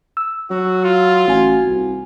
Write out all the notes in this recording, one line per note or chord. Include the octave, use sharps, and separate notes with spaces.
E6
F#3 F#4
F4
A1 F#4 G#5
C2